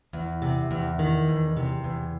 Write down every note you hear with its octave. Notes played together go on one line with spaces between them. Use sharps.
E2
C3
E2
D#3
E2
C3
E2